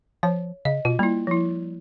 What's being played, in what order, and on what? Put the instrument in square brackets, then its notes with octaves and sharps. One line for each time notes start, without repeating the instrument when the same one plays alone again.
[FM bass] F3 [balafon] C#5
[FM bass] C#3 [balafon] D#5
[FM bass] B2 [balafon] F4
[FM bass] G3 [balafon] A#3 E4
[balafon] F3 E4